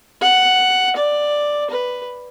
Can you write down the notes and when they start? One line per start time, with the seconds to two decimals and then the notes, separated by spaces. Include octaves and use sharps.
0.21 F#5
0.96 D5
1.70 B4